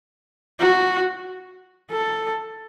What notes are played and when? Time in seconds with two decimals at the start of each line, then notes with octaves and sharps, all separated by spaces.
0.60 F#4
1.91 A4